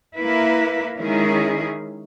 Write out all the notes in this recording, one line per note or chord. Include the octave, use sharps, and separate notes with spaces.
A#3 E4 B4
D#3 G#3 C#4 E4 G#4